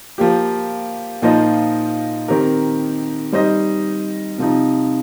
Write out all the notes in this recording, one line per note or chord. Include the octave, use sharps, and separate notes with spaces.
F3 A#3 G4
A#2 F3 D#4 C5 D#5
D#3 C4 G4 A#4
G3 D#4 C5 D#5
C3 F3 D#4